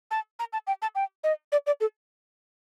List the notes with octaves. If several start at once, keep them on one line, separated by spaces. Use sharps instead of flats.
A5
A#5
A5
G5
A5
G5
D#5
D5
D5
A4